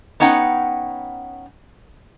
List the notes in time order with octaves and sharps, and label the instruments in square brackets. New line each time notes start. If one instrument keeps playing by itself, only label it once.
[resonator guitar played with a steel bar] B3 C#4 D#4 F#5 G5